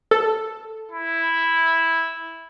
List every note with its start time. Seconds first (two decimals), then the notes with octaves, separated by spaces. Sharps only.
0.11 A4
0.91 E4